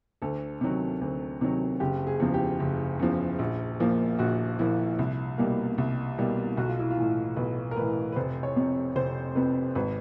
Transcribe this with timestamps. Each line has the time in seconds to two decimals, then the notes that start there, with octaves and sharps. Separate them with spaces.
0.22 D2 A4
0.61 C3 D#3 F#3
1.01 D2
1.41 C3 D#3 F#3
1.80 F#1 G4
2.07 G#4
2.20 E2 C#3 F3
2.34 G4
2.60 F#1
2.99 E2 C#3 F3
3.39 A#1
3.80 A#2 F3 A#3
4.19 A#1 F#4
4.59 A#2 F3 A#3 E4
4.99 C2
5.38 B2 G3 A#3
5.78 C2
6.18 B2 G3 A#3
6.57 B1 F#4
6.68 F4
6.79 E4
6.91 F4
6.97 A2 E3
7.36 B1 B4
7.71 A#4
7.76 A2 E3 B4
8.12 B4
8.16 F1 C5
8.43 C#5
8.56 F2 C3
8.95 F1 C5
9.35 F2 C3 B4
9.75 G#1 B4